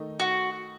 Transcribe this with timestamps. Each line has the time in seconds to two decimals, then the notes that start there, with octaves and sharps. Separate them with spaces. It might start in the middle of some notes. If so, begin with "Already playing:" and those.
Already playing: D#3 A3 D#4
0.20 F#4